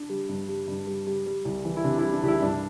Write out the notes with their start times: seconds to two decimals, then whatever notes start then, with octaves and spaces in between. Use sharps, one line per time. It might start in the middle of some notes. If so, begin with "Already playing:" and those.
Already playing: D4
0.09 G3
0.29 G2
0.48 G3
0.68 G2
0.87 G3
1.07 G3
1.26 G3
1.45 C2
1.65 E3
1.77 E4
1.84 C3 D4
1.99 E4
2.03 G3
2.13 D4
2.23 C2 G4
2.28 E4
2.42 G2 D4